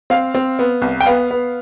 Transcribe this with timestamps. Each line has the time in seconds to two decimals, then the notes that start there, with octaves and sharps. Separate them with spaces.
0.10 C4 F5
0.34 C4
0.59 B3
0.82 C2
1.01 G5
1.06 B3 F5
1.31 B3